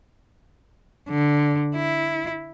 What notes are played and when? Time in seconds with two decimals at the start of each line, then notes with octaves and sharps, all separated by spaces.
1.09 D3
1.76 E4